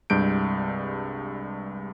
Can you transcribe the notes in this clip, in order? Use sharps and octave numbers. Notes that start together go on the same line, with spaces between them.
C2 G2 G#3 G6 D7